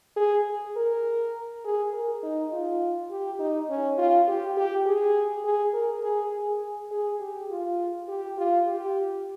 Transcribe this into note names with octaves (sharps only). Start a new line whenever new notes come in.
G#4
A#4
G#4
A#4
D#4
F4
G4
D#4
C#4
F4
G4
G4
G#4
G#4
A#4
G#4
G#4
G#4
G4
F4
G4
F4
G4